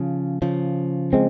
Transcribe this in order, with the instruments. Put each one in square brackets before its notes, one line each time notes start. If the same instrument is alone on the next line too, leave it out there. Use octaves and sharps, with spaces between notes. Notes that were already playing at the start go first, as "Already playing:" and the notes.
Already playing: [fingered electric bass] C#3 F3
C#3 F3
[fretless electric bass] G#3 C4